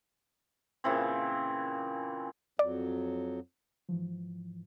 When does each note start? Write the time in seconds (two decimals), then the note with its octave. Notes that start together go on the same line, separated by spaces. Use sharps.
0.84 A#2 C#3 E3 C4
2.59 F2 F#3 D5
3.89 G#2 E3 F3